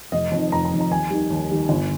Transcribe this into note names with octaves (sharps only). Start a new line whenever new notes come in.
F1 D#5
F2 D#3
F1 A#5
A#5
F2 D#3
A#5
D#2 G#5
D#3 G3
D#2
D#3 G3
G1